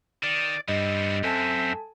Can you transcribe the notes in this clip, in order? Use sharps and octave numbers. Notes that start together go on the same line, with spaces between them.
D#3 D5
G2 B3 C4 D#5
F#2 C4 A4 E5 G#5 A5